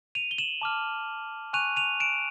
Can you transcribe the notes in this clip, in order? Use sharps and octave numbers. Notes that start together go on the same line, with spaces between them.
D#7 F7
G7
E7 F#7
A5 D6 F6
G#5 C#6 F#6 D#7 F7
D#7 F7
D7 E7